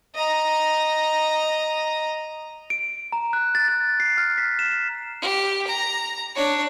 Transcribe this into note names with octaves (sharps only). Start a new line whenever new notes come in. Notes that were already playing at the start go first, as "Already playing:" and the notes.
D#5 A#5
D7
A#5
F#6
A6
A6
C7
F6
B6
E7
G4
A#5
D4 C#5